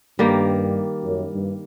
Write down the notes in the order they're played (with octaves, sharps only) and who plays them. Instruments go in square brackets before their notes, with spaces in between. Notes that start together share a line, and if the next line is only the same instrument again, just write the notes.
[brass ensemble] G2 [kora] D#3 G3 A#3
[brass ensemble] F#2
G2